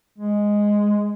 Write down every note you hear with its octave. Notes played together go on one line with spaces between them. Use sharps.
G#3